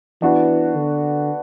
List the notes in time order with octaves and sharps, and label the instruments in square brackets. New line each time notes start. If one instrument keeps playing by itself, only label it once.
[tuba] E3 [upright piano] B3 D4 F#4
[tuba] D3